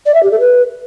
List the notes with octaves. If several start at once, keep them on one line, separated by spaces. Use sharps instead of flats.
D5
E5
G4
A4
B4